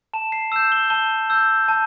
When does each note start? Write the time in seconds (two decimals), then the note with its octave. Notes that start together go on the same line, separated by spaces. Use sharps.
0.13 A5 E7
0.32 C7
0.52 E6 G6 E7
0.72 G7
0.90 A5 G7
1.30 E6 G6
1.68 A5